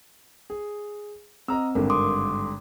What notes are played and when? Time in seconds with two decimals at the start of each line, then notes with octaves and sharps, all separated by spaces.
0.50 G#4
1.48 C4 D#5 A#5 E6
1.75 G#1 G2 D3 A#4
1.90 C6 D6 D#6